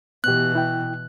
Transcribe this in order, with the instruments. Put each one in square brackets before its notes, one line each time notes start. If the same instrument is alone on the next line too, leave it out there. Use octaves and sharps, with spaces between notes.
[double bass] B2 E3 [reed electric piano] B3 G4 [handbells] F#6
[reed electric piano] E4 G5